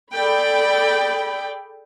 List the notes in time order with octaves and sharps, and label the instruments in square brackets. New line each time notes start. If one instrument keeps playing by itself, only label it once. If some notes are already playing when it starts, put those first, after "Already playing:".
[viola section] G#4 A4 D5 G5 B5